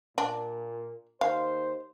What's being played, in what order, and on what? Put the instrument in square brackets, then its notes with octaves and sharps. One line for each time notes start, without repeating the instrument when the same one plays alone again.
[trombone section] A#2 [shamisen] D4
[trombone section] D#2 C5 [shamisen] F5